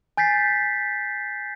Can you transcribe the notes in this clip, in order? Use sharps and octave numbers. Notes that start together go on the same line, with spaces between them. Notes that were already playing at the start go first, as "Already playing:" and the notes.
G#5 G6 A6 B6 C7